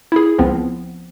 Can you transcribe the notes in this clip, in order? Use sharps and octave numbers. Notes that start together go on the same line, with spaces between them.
E4 G#4
C#2 F3 B3 C4